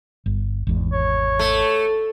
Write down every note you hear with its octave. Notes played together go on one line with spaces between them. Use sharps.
G1
G#1 E2
C#5
A3